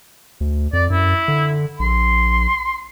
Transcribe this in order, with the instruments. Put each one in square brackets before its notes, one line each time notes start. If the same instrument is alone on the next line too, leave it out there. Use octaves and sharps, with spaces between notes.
[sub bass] D2
[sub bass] F2 [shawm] D5
[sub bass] F#2 [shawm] E4
[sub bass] D3
[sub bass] A#1 [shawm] C6